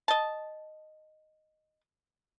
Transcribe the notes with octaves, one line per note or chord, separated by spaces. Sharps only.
D#5 A5